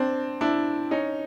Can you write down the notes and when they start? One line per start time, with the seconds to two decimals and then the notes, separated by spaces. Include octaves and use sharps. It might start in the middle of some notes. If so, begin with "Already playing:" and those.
Already playing: C4 D4
0.41 D4 E4
0.91 C#4 D#4